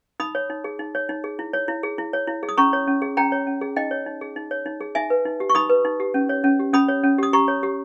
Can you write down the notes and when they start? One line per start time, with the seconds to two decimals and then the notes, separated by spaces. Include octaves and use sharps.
0.20 D#4 B5 D#6
0.35 C#5
0.50 D#4
0.64 G#4
0.79 D#4
0.95 C#5
1.09 D#4
1.24 G#4
1.39 E4
1.53 C#5
1.68 E4
1.83 G#4
1.98 E4
2.13 C#5
2.27 E4
2.43 G#4
2.49 D#6
2.57 C#4 A#5 C#6
2.73 C#5
2.87 C#4
3.02 G#4
3.17 C#4 G5 A#5
3.32 C#5
3.47 C#4
3.61 G#4
3.76 D#4 D#5 G5
3.91 C#5
4.06 D#4
4.21 G#4
4.36 D#4
4.51 C#5
4.66 D#4
4.81 G#4
4.95 D#4 E5 G#5
5.10 B4
5.25 D#4
5.40 G4
5.50 C#6
5.55 D#4 B5 D#6
5.69 B4
5.85 D#4
6.00 G4
6.14 C#4
6.29 C#5
6.44 C#4
6.59 G4
6.73 C#4 B5 D#6
6.88 C#5
7.03 C#4
7.18 G4 D#6
7.33 G4 A#5 C#6
7.48 C#5
7.63 G4